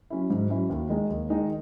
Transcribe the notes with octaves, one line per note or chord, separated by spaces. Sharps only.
F#3 C#4 E4
G#2
F#3 C#4 E4
D#2
D#3 G#3 D#4
D#2
D#3 G#3 D#4